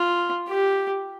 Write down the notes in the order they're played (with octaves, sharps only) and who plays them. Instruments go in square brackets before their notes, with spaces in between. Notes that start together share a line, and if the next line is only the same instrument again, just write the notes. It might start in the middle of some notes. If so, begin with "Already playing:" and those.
Already playing: [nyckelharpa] F4
G4